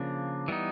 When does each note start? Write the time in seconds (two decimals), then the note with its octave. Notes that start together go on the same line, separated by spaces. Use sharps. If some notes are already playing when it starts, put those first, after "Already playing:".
Already playing: C#3 F3 A#3 D4
0.48 E3 G3 B3 D#4